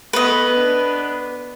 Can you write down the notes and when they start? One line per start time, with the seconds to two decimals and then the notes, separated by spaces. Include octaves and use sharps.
0.13 A3 B3 B4 D#5
0.50 B3 D4